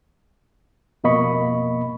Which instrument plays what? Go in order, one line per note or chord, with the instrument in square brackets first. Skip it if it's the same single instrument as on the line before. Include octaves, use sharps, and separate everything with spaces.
[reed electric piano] F2 B2 A#3 D#5 B5 C#6